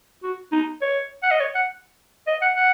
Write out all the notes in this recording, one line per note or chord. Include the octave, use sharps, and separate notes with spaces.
F#4
D#4
C#5
F#5
D#5
C#5
F#5
D#5
F#5
F#5